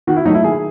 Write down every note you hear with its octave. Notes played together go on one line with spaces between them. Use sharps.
D#3 F#4
E4
F#3 A3 D#4
E4
D#3 G#4